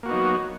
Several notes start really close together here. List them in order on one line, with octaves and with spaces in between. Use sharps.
A#3 F#4 B3 D#4 F#3